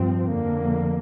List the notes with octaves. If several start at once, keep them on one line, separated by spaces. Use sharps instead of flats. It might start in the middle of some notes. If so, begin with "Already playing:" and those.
Already playing: G2 F3 C4
F2 D3 A#3